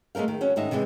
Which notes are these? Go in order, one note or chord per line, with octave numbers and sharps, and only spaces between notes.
G#3 A3 C#4 A#4 F5
D#3
F#3 C#4
G#2 D#3 D#4 E5
C3 E3 G3 G#3